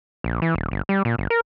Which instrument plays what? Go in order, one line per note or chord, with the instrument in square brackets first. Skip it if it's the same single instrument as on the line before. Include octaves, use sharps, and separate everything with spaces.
[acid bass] A#1
E3
D#1
G1
G3
A#2
G1
A#4